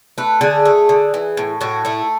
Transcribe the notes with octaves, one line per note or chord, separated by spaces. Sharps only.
A3 B4
D3 G#4
A3
D3
E3
A2
A2 F#4
A3 E4